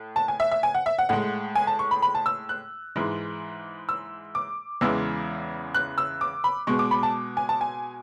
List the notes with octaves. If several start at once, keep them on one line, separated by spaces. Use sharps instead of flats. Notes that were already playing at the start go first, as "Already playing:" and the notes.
Already playing: A2
A5
G#5
E5
E5
G#5
F#5
E5
F#5
A2 G#3 F#5
G#5
A5
C#6
B5
B5
A5
E6
F#6
G#2 E3 G#3
E6
D6
E2 C#3 E3 G#3 E6
F#6
E6
D6
B5
B2 G#3 C#6
D6
B5
A5
G#5
A5
G#5